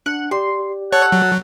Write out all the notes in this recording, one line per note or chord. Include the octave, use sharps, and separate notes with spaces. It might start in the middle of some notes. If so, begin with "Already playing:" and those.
D4 F#5
G4 D5 C6
A4 C#5 F#5
F#3